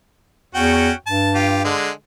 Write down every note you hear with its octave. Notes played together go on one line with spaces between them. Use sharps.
E2 C#4 F#4 G5
G2 A5
F4 G4
D3 G#3